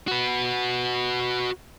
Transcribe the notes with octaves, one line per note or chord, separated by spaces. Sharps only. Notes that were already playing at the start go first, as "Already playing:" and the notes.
F#4 B4